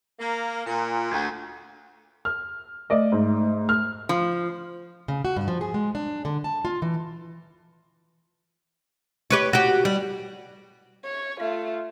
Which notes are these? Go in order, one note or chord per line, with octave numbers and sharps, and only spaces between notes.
A#3
A#2
D2
F6
A3 D5 D#5
G#2
F6
F3
C#3
F#4
G2
F3
G#4
G#3
D4
D3
A5
F4
E3
G4 B4 C#5
F#4 G4
G3
C#5
A3 F4